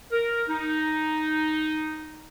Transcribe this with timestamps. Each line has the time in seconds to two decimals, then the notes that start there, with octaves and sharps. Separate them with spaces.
0.12 A#4
0.48 D#4